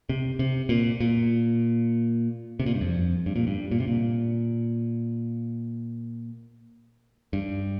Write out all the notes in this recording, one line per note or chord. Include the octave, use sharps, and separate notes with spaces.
C3
C3
A#2
A#2
C3
A#2
G2
F2
G2
A#2
G2
A#2
C3
A#2
G2